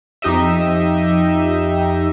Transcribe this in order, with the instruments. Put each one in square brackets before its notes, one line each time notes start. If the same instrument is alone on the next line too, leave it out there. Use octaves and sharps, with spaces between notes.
[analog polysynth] F2 D#4 G4 D#5 E5